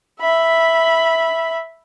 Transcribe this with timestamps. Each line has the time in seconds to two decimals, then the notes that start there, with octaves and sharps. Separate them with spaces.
0.20 E5 B5